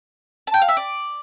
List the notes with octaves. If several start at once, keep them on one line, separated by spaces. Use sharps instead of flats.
A5
G5
F5
E5
D5